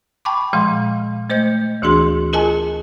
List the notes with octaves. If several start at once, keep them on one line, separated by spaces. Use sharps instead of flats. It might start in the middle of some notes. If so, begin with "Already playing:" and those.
G5 A5 B5 C#6 D6
A#2 F3 G#3 F5 C6
A3 C5 D#5 G6
D2 E3 D4 F#4 G#4 C6
F4 G#4 A#4 D#5 G#5 A5